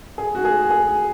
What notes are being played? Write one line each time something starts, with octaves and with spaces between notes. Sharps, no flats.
G#4
F#4
G#4
G#4